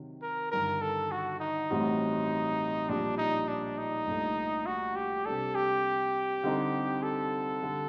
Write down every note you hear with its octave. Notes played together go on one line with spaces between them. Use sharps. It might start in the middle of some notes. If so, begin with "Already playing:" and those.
Already playing: C3 D#3 F#3
A#4
G1 G2 D#3 A#4
A4
F#4
D#4
A1 A2 G3 C4 F#4
A#1 A#2 G3 D4
D#4
D4
D#4
C2 A#2 A3 D4
F#4
G4
C3 G3 D4 A4
G4
D3 G3 C4 D#4
A4
D3 G3